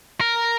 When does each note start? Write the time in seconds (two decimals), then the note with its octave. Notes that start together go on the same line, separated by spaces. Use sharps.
0.21 A#4